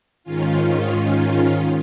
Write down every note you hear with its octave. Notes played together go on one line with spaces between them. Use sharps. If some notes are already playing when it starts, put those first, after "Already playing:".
G#2 D#3 C#4 F4